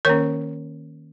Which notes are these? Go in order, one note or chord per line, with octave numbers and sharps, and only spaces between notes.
D#3 A#3 C#4 A#4 C#5